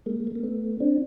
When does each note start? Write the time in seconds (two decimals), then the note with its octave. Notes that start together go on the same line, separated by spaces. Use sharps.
0.06 G#3 A#3
0.20 G#3
0.27 A3
0.35 A#3
0.43 A3 B3
0.80 C4 D4